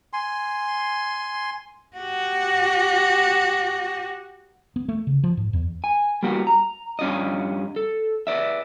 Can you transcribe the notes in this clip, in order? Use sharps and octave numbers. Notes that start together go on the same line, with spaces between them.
G#5 C6
F#4 G4
B3
A3
C#3
F3
G#2
E2
G#5
G3 A#3 B3 F#4
A#5
G2 C#4 F4 D5 D#5
A4
B4 D5 E5